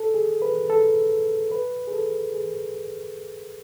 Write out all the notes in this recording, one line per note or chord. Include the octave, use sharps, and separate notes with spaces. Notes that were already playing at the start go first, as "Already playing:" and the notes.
Already playing: A4
G#4
B4
A4
B4
G#4
A4
G#4